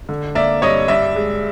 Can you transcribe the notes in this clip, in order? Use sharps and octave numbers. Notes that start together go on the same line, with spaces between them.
D3
A#3 D5 E5
G2 C#5 D#5
G2 D5 E5
G#3